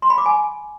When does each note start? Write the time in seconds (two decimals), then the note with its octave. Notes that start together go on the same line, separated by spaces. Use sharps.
0.02 C6
0.10 B5
0.18 D6
0.26 G#5